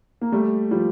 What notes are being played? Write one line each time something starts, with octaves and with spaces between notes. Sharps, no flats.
A#3
G3 A3
F3 G3